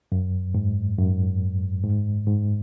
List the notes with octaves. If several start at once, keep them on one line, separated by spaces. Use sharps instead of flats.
F#2
G#2
F#2
G#2
G#2